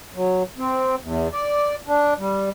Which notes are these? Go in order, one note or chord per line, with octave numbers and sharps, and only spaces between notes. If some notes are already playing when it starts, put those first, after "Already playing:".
F#3
C4
E2
D5
D4
G3